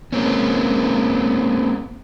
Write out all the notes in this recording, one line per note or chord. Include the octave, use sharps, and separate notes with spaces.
G#3 A#3 C4 C#4